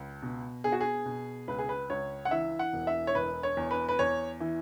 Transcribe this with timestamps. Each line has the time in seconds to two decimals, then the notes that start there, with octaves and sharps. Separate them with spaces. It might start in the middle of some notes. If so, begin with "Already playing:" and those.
Already playing: C#2
0.22 B2
0.64 B2 G#4
0.72 F#4
0.81 G#4
1.06 B2
1.48 C#2 B4
1.58 G#4
1.69 B4
1.90 C#2 C#5
2.25 F#5
2.31 E3 E5
2.59 F#5
2.73 E1
2.87 E5
3.07 C#5
3.15 E1 B4
3.43 C#5
3.57 E2
3.71 B4
3.89 B4
3.99 E2 C#5
4.41 E3